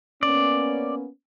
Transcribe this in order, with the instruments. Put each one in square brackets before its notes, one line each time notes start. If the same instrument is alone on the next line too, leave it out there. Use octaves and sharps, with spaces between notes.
[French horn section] A#3 B3 C#4 [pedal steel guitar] D5